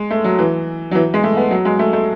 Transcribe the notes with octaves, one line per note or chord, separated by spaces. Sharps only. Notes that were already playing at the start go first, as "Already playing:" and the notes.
Already playing: G#3
A3
F#3
E3
F#3
E3
G#3
A3
B3
F#3
G#3
A3
A3